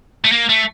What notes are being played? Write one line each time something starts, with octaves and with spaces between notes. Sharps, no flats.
A3
A#3
A3